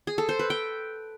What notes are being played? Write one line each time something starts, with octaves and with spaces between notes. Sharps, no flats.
G#4
A4
C5
B4
G5